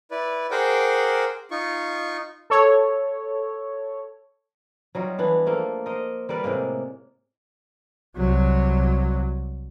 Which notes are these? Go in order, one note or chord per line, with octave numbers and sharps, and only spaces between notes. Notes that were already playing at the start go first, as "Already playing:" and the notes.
E4 B4 D5
G#4 A#4 C5 F#5 G5 D6
D#4 F4 C#6
A4 C#5
F#3 G3 D#4 F4
E3 B3 D4
F3 A3 A#3
A#4 C5 D#5
G3 A#4 B4 D5
A2 C3 G#3 A#3
C2 F#3